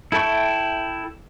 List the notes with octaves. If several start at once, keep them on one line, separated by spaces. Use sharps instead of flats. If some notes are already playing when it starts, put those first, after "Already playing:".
E4 A4 E5 G5 C#6